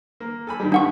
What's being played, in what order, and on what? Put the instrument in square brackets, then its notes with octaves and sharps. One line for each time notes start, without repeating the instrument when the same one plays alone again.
[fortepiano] A#3
A4 G#5 B5
G2 D#3 G3
[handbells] D4 F#5 C#6